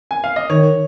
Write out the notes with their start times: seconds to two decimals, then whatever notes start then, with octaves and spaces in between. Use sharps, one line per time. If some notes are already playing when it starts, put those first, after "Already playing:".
0.11 G#5
0.24 F5
0.36 D#5
0.50 D#3 C#5